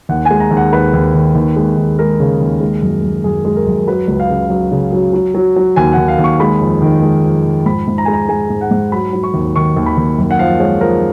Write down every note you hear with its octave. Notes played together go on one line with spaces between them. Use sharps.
D#2 F#5
G#5
G#3
A#5
D#2
F#5
D#2 B4
D#2
D#3
D#2
G#3
D#2
G#3 A#4
C#3
D#2
G#3
F#2
F#2
F#2 G#4
G#3
A#4
F#2
F#3 B4
C#2
F5
C#3
F#3
C#3
F#3
F#3
F#3
F#3
D#2 G#5
D#2 F#5
F5
D#2
C#6
G#3 B5
F2
D#3
G#3
F2
F2
G#2 B5
G#2
A#5
G#3 G#5
A#5
G#3 G#5
G#2
F#5
G#2
F#3 B5
F#3
C#6
D#2
D#3 C#6
D#2
B5
D#2
F#2
F#5
F3 F5
G#3 C#5
F3 A#4